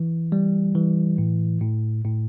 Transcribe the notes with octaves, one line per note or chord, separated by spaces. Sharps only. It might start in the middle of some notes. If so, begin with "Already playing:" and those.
Already playing: E3
G3
E3
A2
A2
A2